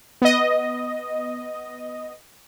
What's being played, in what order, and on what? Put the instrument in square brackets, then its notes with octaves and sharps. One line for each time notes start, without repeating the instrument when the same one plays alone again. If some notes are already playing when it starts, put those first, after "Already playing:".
[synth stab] B3 D#5